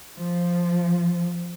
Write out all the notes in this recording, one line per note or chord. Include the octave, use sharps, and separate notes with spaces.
F3